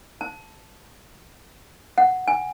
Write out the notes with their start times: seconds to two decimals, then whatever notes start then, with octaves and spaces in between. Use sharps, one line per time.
0.21 A5
1.98 F#5
2.28 G#5